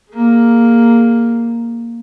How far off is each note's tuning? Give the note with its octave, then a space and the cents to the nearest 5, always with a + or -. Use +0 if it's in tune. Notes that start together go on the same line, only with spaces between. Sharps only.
A#3 +0 G#4 +0